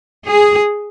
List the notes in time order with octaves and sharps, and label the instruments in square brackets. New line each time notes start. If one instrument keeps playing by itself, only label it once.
[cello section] G#4